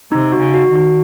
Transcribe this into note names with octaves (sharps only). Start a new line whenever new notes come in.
C3 D#4
F#4
C#3
F#4
D#3
F#4